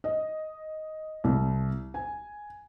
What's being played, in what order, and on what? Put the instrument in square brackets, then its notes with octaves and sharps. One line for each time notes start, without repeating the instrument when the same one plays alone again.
[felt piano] D#5
C2
G#5